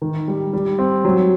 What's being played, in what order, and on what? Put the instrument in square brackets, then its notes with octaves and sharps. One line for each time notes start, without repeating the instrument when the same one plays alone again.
[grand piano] D#3
G3
G3
C4
F#3